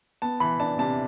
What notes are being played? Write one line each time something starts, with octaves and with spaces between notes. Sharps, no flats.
B3 A5
E3 B5
D4 A5
C3 A5